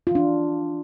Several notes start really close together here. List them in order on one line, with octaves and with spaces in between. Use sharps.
F4 E3 D4